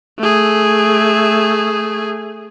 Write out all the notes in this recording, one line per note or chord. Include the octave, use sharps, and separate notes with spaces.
A3 G#4